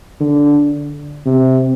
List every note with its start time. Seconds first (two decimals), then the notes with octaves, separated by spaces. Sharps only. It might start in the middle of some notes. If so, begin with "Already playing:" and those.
0.20 D3
1.26 C3